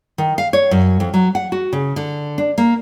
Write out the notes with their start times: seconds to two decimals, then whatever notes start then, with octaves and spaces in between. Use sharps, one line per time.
0.18 D#3
0.38 F5
0.53 C#5
0.71 F#2
1.00 F2
1.14 F#3
1.35 F#5
1.52 F#4
1.73 C#3
1.96 D3
2.38 D4
2.58 A#3